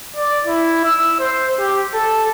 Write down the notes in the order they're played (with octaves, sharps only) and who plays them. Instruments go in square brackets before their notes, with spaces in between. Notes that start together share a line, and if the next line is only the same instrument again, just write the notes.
[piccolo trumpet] D5
E4
E6
C5
G4
A4